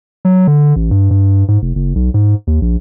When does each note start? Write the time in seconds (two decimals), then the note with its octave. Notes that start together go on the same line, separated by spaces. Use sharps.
0.25 F#3
0.47 D3
0.76 A1
0.91 G2
1.11 G2
1.48 G#2
1.62 F1
1.75 F#1
1.95 B1
2.14 G#2
2.47 D#2
2.62 A#1